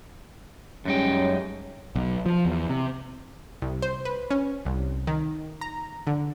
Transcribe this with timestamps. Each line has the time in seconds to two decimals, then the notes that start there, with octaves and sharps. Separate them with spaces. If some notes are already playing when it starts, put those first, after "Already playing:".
0.85 F#2 G3 G#3 C#4 D#4 G5
1.96 B1
2.26 F3
2.45 E2
2.69 C3
3.62 C2
3.82 C5
4.05 B4
4.31 C#4
4.65 C2
5.07 D#3
5.61 A#5
6.07 D3